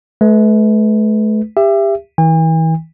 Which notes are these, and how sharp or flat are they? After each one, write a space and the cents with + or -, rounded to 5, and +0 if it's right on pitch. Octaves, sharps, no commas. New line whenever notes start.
A3 -40 B4 +0
G4 +25 E5 +25
E3 -40 G#5 -45